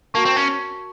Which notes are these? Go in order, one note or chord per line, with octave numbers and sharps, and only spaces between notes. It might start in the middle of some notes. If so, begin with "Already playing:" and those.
A#3 F#4 A#4 F5 A5 C#6
C4
C#4